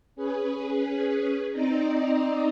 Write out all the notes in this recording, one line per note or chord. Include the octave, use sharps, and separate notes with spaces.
C#4 G#4 B4
C4 D#4 D5 D#5 A#5